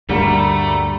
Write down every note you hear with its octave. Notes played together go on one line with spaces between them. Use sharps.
D2 G2 G3 A3 A#3 F#4 A#5